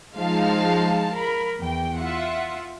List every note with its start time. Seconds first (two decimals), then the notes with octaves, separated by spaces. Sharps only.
0.16 F3 G#3 D#4 F5 A5
1.16 A#4 B5
1.60 E2 G5
1.98 F4 E5 F#5